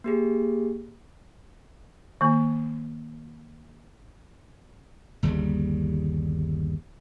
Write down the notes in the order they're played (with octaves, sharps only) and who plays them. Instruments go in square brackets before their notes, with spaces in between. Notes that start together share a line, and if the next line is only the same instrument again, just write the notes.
[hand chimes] A#3 G4 G#4
[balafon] D#3 A#3
[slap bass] G1 D#2 C#3 G3